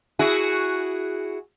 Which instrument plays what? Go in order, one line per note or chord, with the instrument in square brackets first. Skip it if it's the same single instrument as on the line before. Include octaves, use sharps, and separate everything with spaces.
[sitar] E4 F#4 G#4